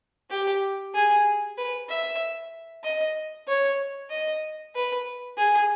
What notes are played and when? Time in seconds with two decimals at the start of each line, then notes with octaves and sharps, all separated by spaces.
0.30 G4
0.94 G#4
1.58 B4
1.89 E5
2.84 D#5
3.48 C#5
4.11 D#5
4.75 B4
5.37 G#4